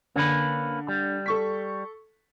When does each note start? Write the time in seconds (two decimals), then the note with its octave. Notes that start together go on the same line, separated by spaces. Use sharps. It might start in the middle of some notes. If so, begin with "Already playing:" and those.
0.16 D3 A#3 C#4 B4
0.88 G3
1.26 A4 C#6 B6